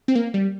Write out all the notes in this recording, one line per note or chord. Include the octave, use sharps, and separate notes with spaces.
C4
A#3
G3